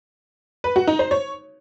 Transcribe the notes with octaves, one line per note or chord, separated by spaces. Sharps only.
B4
F#4
D#4
C5
C#5